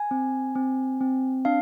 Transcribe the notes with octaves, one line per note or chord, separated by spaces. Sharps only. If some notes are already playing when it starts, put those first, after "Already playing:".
Already playing: G#5
C4
C4
C4
D4 F5